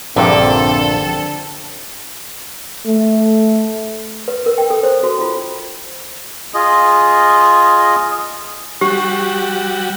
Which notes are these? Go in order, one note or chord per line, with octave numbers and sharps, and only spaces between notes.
A#1 G2 A#2 D3 C4 A4
A3
B4
A#4
G5
A4
C5
F#4
F4
F4 G#4 D#5
G3 F#4 G4